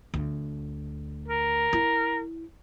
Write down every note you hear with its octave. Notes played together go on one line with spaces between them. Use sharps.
D2
A#4
E4